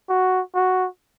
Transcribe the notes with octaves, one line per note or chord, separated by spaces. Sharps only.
F#4
F#4